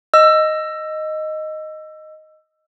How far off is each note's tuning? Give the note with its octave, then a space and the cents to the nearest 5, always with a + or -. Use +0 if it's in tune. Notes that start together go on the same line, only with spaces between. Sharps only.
D#5 +0 E6 +20